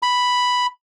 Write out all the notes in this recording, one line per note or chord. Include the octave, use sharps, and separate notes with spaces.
B5